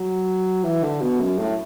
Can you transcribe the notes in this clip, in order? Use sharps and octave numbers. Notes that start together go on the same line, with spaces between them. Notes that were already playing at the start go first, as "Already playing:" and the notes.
Already playing: F#3
E3
D3
B2
F#2
A2